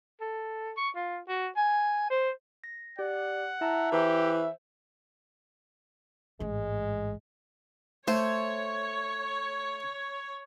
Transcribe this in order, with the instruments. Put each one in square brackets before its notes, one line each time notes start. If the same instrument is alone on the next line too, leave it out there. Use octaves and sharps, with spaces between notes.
[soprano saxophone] A4
C#6
F4
F#4
G#5
C5
[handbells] A#6
[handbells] G4 [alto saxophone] D5 [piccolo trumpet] F#5
[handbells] E4 A5 A#5 [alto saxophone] E5
[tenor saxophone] E3 [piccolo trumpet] G4 [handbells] C5
[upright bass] A1 G#2 [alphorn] G#3
[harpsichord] A3 [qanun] C5 [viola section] C#5